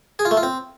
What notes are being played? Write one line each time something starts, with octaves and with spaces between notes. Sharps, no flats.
G#4
F4
A3
F4
C4